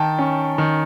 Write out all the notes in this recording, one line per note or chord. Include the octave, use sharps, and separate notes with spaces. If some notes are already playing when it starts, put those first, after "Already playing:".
Already playing: D#3 G5 A5
C#4
D#3